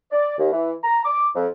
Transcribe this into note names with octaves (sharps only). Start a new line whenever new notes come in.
D5
D#2
E3
A#5
D6
F2